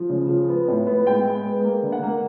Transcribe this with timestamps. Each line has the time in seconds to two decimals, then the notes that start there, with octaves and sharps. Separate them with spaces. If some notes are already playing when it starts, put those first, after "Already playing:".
Already playing: F3
0.10 C#3
0.29 F3
0.49 B3
0.68 A2
0.87 B3
1.06 G#3 G5
1.25 G#3
1.45 B3
1.64 A#3
1.83 D3
1.92 F#5
2.03 A#3